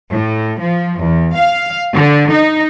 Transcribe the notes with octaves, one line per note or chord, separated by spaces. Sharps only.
A2
F3
E2
F5
D3
D#4